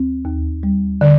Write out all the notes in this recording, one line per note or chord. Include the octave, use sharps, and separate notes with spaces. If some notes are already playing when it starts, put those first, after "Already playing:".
Already playing: D2 C4
D#2
G3
D3